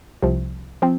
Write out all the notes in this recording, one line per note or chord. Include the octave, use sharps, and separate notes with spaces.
C2 C3 F3
F3 C4